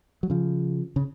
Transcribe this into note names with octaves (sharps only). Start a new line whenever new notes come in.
F#3
C#3 F3
C#3